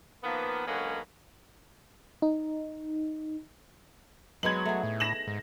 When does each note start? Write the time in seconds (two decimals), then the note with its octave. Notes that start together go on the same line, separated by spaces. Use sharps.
0.23 D#3 F3 A#3 B3
0.67 D3 F#3 G#3 A#3 B3 C#4
2.22 D#4
4.43 F#3 G#3 B3 D#4 G#6 F#7
4.65 A3 G#4
4.83 A2
5.00 A#6 E7 F#7
5.27 G#2